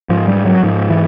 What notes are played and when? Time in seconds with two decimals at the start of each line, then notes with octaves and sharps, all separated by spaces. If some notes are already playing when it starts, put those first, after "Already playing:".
0.09 G#2 F3
0.28 G3
0.45 F#3
0.63 G#2 F3
0.90 E3